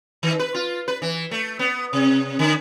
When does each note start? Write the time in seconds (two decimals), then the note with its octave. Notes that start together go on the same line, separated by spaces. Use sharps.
0.23 D#3
0.39 B4
0.54 F4
0.88 B4
1.02 E3
1.31 A3
1.59 B3
1.93 C3
2.39 D3